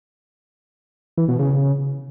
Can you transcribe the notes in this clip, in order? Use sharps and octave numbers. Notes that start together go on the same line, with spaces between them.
E3
B2
C#3